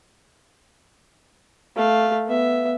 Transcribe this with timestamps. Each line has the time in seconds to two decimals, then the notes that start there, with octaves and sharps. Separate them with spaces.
1.76 A3 F5
2.27 B3 E5